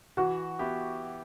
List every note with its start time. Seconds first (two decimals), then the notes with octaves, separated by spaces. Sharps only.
0.17 E3 F#4
0.59 B3 E4 G4